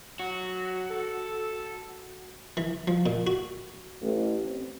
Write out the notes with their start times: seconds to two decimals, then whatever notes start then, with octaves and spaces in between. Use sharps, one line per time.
0.20 F#3 F#4
0.90 A4
2.57 E3
2.87 F3
3.06 A#2
3.27 F#4
4.01 A1
4.45 C4